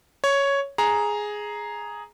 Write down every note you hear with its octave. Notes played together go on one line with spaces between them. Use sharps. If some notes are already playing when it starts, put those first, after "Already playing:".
C#5
G#4 A#5